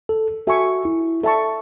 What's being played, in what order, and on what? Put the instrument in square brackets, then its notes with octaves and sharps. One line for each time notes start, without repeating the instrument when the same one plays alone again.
[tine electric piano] A4
[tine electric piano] F#4 [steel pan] A4 E5 G#5 C#6
[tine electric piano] E4
[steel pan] A4 E5 A5 C#6